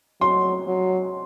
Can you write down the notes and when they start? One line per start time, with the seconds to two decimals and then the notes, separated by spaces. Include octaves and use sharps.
0.21 F#3 C6
0.67 F#3